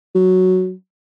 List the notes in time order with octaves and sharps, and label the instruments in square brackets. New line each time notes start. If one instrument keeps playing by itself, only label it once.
[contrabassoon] F#3